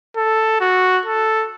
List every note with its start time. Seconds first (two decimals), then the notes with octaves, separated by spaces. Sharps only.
0.16 A4
0.61 F#4
1.06 A4